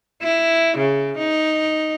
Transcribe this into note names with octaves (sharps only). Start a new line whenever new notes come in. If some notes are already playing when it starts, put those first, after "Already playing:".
E4
C#3
D#4